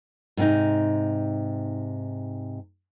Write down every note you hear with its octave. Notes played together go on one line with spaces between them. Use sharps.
G#2 C3 D#4